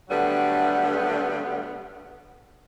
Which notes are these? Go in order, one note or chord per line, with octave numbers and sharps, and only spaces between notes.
D3 F#3 G3 A3 B3